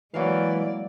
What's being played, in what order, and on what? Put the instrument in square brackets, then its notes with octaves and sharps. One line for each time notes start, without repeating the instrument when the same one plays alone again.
[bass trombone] E3 [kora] F#3 A#3 F5 [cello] G#3 D5